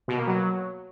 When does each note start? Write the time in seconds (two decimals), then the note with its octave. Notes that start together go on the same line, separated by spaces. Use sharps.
0.08 B2
0.18 A#3
0.27 F#3